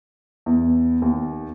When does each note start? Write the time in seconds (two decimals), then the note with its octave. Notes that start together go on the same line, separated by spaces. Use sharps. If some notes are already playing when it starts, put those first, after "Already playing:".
0.46 E2
1.02 D#2